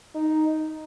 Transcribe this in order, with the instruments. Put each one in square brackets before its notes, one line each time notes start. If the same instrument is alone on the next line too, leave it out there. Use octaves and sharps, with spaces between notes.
[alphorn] D#4